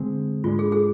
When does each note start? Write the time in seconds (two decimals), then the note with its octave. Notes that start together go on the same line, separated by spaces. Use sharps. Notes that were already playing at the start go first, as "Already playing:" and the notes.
Already playing: D3 G#3 C4 G#4
0.44 G#2 G#3 D4 F4
0.59 G#4
0.72 G#4